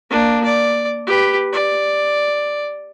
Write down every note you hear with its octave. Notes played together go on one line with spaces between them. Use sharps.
A#3 D4
D5
G4 B4
D5